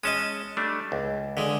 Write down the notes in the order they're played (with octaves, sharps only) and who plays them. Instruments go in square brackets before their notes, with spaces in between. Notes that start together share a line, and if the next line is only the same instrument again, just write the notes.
[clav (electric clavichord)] G#3 C#4 [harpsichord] D#5 A5 D#6
[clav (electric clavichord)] G3 A3 D4
C#2
[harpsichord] D3 G#3